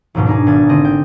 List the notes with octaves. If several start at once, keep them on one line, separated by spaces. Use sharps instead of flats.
A#1 D#2 G#2 B2
D4 D#4 G#4
G#1 G#5 A6
D3 C4 D#5
G5